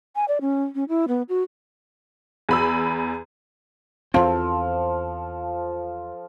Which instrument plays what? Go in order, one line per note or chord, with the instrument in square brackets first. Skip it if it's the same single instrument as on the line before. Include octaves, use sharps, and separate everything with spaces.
[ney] G#5
D5
C#4
C#4
E4
B3
F#4
[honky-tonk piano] E2 B5 E6
[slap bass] E2 C4 [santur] F3 A4